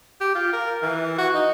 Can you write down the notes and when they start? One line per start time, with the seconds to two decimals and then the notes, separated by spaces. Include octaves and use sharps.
0.21 G4
0.35 F4
0.53 A#4
0.82 E3
1.18 F#4
1.34 D#4